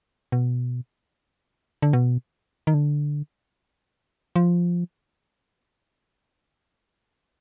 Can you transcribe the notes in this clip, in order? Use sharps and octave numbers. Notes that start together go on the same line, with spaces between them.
B2
D3
B2
D#3
D3
F3